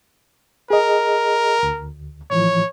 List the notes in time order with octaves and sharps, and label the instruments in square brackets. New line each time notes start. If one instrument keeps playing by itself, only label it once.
[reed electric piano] G#4 D#5 [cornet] A#4
[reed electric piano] D2
[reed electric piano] A2 E3 F3 [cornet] C#5